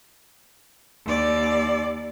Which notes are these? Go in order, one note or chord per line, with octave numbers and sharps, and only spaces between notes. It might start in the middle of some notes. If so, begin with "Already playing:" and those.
D#2 D5